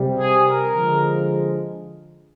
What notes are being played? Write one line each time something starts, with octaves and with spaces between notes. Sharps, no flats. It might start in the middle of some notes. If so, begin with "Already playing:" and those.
Already playing: C3 G3
G#4
A#4
D3 F3 G#3